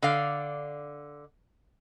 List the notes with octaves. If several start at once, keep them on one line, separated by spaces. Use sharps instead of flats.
D3 D5 F5